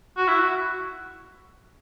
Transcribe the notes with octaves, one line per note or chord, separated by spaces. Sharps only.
F#4
E4
F#4